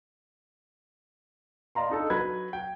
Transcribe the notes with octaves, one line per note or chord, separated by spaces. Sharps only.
D5 D#5 F5 A#5 C6
D4 D#4 A4
F#3 B4 B5 G#6
G5